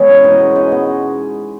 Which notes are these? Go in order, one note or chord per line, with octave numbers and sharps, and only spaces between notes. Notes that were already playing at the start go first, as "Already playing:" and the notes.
Already playing: E3 G#3 B3 G#4 C#5
C#4
B2 D#4 D#5
G#3
B2 D#4 D#5
B3